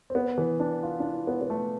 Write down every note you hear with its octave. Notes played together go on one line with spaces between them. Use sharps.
C4
B3
E3
D4
F4
D4
E4
B3
B3
A3